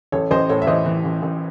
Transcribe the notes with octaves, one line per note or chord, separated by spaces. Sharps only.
A1 A4 C#5
A1 C5 D#5
A2 A4 C#5
E5
E3 C5 D#5
E3
A1
A1